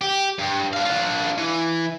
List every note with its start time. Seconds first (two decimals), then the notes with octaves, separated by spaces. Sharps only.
0.01 G4
0.38 G2
0.73 D4 F5
0.85 D4 F4
1.38 E3